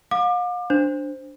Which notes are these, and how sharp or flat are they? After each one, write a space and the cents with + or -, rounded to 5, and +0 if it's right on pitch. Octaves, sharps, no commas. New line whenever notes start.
F5 +40 D6 +30
D4 +0 C5 +0